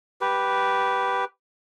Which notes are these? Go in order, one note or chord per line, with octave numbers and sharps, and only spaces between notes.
G4 B4